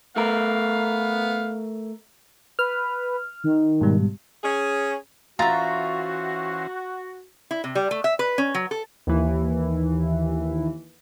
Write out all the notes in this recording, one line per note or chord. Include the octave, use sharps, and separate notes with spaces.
A3 B3 A#4 F5
B4 F6
D#3
G#2 B2 G3
C#4 G#4
E3 C#4 F4 F#4 C5 E5 A#5 A6
E4
C3
G3
A3
E5
B4
C#4
F#3
A4
D#2 E3